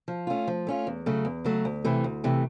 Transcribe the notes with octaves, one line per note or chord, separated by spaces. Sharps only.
F3
A3 C#4 F4
F3
A3 C#4 F4
E2
C#3 F#3 A3
E2
C#3 F#3 A3
D2
C3 E3 A3
D2
C3 E3 A3